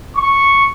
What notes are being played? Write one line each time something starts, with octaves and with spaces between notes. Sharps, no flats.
C#6